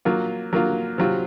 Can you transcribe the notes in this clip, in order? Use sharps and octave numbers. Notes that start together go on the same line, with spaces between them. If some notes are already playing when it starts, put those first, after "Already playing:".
F#3 A#3 F4
F#3 A#3 F4
C3 F#3 C4 F4